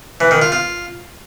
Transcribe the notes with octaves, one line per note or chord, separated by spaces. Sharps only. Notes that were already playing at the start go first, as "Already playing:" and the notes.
E3
D#3
F4
F4